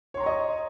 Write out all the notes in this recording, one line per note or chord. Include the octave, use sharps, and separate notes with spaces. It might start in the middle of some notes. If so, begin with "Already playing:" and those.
C#5 D#5 A#5 C6 C#6